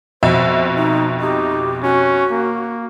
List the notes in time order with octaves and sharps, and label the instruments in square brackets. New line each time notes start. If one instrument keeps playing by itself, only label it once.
[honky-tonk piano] F2 B2 E5 [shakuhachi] C5
[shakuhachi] D#4
[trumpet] D#4 [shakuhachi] G4
[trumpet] C#4 [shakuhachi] F#4
[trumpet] A#3